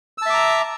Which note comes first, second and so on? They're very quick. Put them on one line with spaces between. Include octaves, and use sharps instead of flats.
E6 A5 E5 D6 A#5